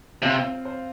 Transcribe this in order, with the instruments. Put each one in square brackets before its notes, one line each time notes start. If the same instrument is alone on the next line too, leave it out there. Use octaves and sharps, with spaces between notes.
[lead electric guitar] C3 [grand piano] F4
[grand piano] C4
C5